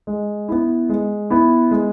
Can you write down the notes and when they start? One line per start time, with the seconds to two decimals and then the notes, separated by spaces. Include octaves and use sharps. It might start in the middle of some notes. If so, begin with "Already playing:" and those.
0.07 G#3
0.48 B3 E4
0.89 G#3
1.30 B3 E4
1.71 G#3